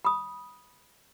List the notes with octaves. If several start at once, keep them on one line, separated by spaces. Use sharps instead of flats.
B5 D#6